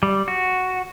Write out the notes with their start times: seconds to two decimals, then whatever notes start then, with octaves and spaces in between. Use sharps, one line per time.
0.03 G3
0.28 F#4